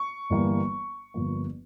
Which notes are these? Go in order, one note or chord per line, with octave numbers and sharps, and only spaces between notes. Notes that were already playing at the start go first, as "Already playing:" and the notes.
Already playing: C#6
G1 G2 E3 G3 A#3
G1 G2 F3 A#3